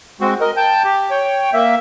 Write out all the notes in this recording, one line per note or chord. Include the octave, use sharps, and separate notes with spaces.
G#3 C4 F#4
A#4 D#5
G5 A5 G6
G4
C#5 G5
A#3 E5